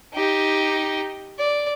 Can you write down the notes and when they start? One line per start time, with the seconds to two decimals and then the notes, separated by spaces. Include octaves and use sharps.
0.14 D#4 G4
1.39 D5